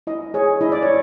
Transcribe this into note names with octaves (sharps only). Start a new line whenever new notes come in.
E4 D#5
G#4 C#5
E4 D#5
D5
C#5